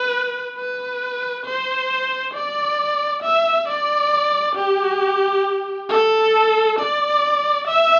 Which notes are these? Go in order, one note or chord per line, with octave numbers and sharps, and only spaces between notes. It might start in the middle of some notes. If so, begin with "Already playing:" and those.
Already playing: B4
B4
C5
D5
E5
D5
G4
A4
D5
E5